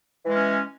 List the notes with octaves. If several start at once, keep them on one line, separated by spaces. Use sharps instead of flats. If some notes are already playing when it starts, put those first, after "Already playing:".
E3 G#3 C#4